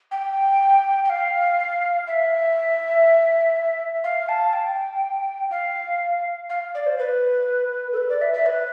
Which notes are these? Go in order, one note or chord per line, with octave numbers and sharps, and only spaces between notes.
G5
G5
F5
E5
F5
A5
G5
F5
F5
D5
C5
B4
A4
B4
D5
E5
E5
B4